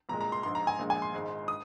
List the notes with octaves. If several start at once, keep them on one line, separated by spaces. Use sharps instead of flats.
C2 A#2 G#3 A#5
A#5
C6
A#1 G#2 G#3 C6
A#5
G#5
A#1 A#2 F3 G#3
G#5
C6
G#1 G#2 G#3
D#6